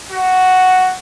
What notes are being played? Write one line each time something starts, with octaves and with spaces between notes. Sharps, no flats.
F#4